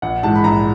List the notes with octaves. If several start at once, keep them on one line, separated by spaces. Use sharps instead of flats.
A#1 F#5
G#2 E3 G#3 A5
B5
A#1 A#5